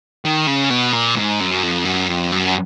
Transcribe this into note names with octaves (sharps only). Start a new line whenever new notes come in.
D#3
C#3
B2
A#2
G#2
F#2
F2
F#2
F2
F#2